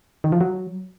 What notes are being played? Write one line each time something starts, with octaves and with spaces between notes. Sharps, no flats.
D#3
F3
F#3